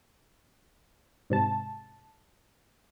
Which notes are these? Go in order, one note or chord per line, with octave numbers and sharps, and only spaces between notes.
G#2 C3 A5